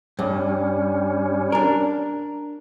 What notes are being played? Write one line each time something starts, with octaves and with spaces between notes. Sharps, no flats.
G2 G3 C#4
D4 A#4